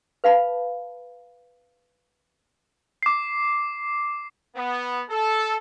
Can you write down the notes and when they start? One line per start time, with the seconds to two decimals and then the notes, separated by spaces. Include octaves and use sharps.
0.24 B4 F5 A5 B5
3.03 D6 C7
4.55 B3
5.08 A4